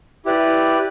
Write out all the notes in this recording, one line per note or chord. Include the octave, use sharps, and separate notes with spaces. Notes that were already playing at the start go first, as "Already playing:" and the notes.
E4 G4 B4 D5